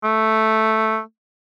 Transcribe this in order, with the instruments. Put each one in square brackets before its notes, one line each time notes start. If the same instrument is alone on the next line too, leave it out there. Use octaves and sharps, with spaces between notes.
[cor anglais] A3